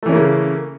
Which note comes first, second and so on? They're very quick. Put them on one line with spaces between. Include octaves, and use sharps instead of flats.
A3 E3 C#4 A#3 C#3